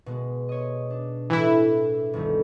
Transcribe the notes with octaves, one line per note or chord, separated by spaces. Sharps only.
B2 G#3
C#5 D#5
D4
A2 E3 E4
E5
G1 D2 D#3